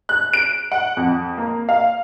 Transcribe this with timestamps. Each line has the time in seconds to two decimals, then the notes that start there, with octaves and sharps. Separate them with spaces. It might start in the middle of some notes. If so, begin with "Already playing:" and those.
0.09 F#6
0.34 D7
0.72 F#5
0.97 F2
1.38 A#3
1.69 F5